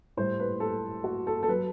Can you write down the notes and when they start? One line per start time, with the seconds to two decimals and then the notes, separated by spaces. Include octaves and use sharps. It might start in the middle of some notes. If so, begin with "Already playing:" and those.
0.17 A2 G3 C5
0.40 B4
0.60 A4
1.04 F#4
1.27 A4
1.43 A4
1.49 F#3 B4